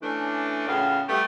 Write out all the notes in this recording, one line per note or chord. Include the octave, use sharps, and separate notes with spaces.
E3 A3 C#4 D4
A2 C#3 B3 F4 F#4 F5
G3 A3 B3 E4 G4